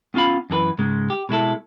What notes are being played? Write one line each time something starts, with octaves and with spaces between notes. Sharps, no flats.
B3 C#4 F4 F5 B5
F#2 E3 G#4 B4
G#2 C#3 G#3
G4
B2 G#3 E4 A4